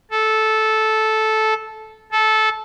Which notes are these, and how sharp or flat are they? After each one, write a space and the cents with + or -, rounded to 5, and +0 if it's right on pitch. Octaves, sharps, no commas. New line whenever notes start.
A4 -10
A4 -15